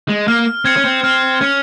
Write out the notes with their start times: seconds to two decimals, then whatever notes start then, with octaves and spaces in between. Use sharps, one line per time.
0.09 G#3
0.28 A#3 F6
0.65 C4 G#6 C#7
0.76 C#4
0.85 C4
1.04 C4 F6
1.41 C#4 G#6 C#7